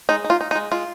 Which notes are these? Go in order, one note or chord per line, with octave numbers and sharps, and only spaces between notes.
G#3 D#4
D#4
F4
D#4
D#4
G#3
G#3 F4